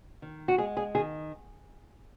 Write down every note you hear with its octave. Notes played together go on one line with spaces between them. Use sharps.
D#3
F#4
G#3 G#4
G#4
D#3 G#4